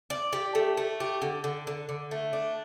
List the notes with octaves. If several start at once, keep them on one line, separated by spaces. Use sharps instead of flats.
D5
G4
A3
A3
G4
D3
D3
D3
D3
A3
D4